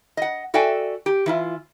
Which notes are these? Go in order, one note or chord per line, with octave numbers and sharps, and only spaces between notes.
D#5 F#5
F#4 A4 D5 E5 G5 G#5
G4
E3 E4 F4